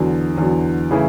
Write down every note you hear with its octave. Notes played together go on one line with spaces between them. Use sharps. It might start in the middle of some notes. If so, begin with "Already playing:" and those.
Already playing: E2 D3 F#3
E2 D3 F#3
C#3 E3 A3 E4